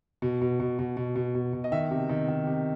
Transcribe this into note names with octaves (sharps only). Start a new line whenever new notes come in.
B2
B2
B2
B2
B2
B2
B2
B2
D#5
D#3 E5
C3
D#3
D#3
C3